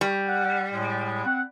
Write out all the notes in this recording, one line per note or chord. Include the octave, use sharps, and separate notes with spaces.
G3
F#5
A2 G#3
C4 F#5